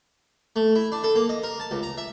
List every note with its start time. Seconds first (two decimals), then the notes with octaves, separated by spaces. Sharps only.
0.56 A3
0.75 E4
0.92 D4
1.04 A4
1.16 A#3
1.29 D#5
1.43 A#4
1.60 A5
1.71 C#2
1.83 A#5
1.98 E5